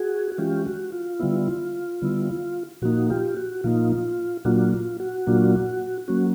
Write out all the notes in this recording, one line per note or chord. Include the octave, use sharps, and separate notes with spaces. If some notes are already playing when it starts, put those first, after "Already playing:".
Already playing: F#4 G#4
F#4
E3 G#3 C#4 F4 G4
F#4
F4
D3 G3 B3 E4
D3 G3 B3 E4
A#2 F3 A#3 D#4 F#4
F4 G4
F#4
A#2 F3 A#3 D#4 F4
A#2 F#3 A#3 D4 F4 F#4
F4
F#4
A#2 F#3 A#3 D4 F4
F#3 A#3 C#4 F#4